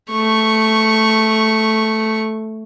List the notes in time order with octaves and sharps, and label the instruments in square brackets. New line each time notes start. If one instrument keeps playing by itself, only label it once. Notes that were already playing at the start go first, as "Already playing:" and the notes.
[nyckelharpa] A3 C#6